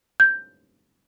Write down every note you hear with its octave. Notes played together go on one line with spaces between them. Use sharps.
G6